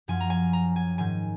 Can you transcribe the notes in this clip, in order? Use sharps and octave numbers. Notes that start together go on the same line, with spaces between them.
F#2 F3 G#5
A#5
G#5
A#5
G#5
G#2 D#3 G#5